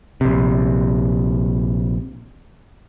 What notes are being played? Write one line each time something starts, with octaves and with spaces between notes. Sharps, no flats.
A#1 C3